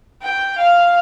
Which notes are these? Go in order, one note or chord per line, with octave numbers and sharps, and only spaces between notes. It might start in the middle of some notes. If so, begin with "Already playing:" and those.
G5
F5